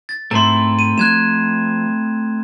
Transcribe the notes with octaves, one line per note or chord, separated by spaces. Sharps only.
A6
G#2 A3 C4 E4 A#5 C6
D#7
F3 F#6 G#6 E7